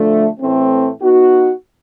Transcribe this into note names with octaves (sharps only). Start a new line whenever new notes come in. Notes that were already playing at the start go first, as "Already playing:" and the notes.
Already playing: D3 F3 A3
A2 E3 A3 C4
B3 D#4 F#4